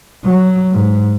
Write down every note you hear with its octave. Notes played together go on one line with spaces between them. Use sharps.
F#3
G#2